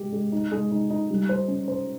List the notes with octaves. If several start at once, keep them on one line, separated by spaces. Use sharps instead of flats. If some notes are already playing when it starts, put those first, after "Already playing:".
Already playing: G#3 G4
G#3
D#4
G#3
D#4
D#4
G3
C5
C#4
C5